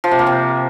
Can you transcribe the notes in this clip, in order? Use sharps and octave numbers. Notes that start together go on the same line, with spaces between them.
F3
C3
A#3
C3